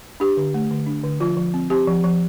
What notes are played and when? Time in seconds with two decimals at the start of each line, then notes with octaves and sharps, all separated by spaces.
0.20 D4 G4
0.37 D3
0.54 A3
0.71 D3
0.86 D4
1.04 D3
1.20 F3 F4
1.37 F3
1.54 C4
1.70 C4 G4
1.87 F3
2.04 F3